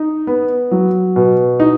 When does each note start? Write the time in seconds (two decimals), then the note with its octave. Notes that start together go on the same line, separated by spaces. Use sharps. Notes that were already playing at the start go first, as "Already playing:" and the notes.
Already playing: D#4
0.27 B3
0.71 F#3
1.16 B2
1.60 D#4